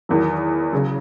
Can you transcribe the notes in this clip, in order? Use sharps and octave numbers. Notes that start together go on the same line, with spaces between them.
E2 D#3 F#3
C#3 F#3